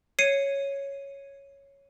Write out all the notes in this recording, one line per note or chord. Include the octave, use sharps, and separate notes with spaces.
C#5 C7 C#7 D#7